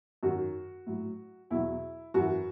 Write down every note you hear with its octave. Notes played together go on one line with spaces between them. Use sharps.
F#2 D#3 F#3 F#4
A2 F#3
E2 B2 F#3 E4
F#2 E3 F#4